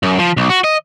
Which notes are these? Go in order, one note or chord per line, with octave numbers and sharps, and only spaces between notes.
F#2
F3
B1
F#4
D#5